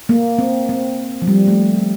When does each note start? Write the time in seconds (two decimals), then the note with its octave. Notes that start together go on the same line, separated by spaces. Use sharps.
0.09 A#3
0.39 C4
0.69 C4
1.22 F3
1.27 G3
1.47 A3